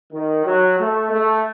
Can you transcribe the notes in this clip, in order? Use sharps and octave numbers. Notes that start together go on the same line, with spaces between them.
D#3
F#3
A3
A3